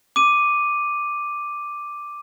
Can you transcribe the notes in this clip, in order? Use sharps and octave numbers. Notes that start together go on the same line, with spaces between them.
D6 D#7